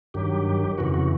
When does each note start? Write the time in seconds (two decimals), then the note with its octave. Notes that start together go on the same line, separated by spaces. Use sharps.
0.14 G2 D#3 F#3 G4
0.78 F2 C#3 E3 F#4
0.94 F#4